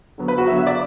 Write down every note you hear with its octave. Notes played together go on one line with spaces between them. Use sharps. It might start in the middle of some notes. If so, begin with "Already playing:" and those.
D3 F#3 B3
B4
F#4
D3 F#3 B3 E5
E5
D5